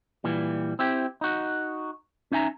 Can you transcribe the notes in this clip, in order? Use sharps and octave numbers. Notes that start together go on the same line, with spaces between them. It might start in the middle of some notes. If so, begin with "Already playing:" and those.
A#2 E3 G3
C4 E4 G4
D#4 F#4
C#4 D#4 E5 G#5 A#5